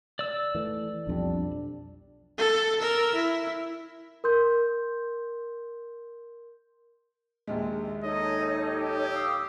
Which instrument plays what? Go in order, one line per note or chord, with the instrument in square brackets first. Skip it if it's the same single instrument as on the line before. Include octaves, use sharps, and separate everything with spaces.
[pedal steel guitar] D5 E6
[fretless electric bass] E3 A3
[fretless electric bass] B1 F2 G3 [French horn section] D4
[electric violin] A4
A#4 E6
E4
[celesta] A#4 C6 G6
[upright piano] A#1 D#2 G#3
[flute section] D#4 A4 C#5 [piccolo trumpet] D#5
[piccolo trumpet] G4
[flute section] F5 D#6 E6